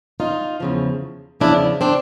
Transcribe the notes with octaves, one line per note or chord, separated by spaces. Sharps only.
D#4 F4
E2 C#3 F3
E2 C#3 F3 D4 E4
C4 D4